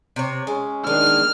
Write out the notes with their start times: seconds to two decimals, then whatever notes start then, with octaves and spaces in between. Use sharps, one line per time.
0.16 C3 C#5
0.47 G#3 C#4
0.87 D#3 G#3 D4 F6